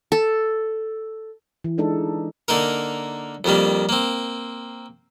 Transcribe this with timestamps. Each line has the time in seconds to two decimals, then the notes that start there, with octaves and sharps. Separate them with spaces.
0.12 A4
1.64 E3
1.78 E3 G#3 D4 D#4 A4
2.48 D3 A#3 D#4 A#4
3.44 F2 D#3 G3 A#3
3.89 A#3 C4